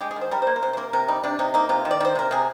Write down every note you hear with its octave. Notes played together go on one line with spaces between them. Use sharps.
G#3 G4
G#4
D#3
C5
G3 A#4
A#3 C5
A#4
C3 C5
C5
A#3 A#4
C3 A#4
G3 D#4
C3 D4
C3 D#4
A#3 D#4
C3 F4
D#3
D5
D#3 C5
C3 A#4
C3 G#4